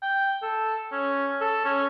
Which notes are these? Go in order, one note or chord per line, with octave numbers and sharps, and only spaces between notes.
G5
A4
C#4
A4
C#4